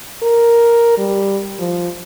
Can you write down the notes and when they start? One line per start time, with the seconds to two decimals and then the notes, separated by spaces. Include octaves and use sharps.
0.22 A#4
0.98 G3
1.59 F3